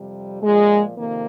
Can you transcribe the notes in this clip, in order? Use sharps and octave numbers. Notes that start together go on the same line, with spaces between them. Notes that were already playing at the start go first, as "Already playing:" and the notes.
Already playing: F2 C3 G3
A#2 F3 G#3
F2 C3 D#3 A#3